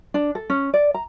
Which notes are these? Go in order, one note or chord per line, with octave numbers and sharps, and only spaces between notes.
D4
A4
C#4
D5
A#5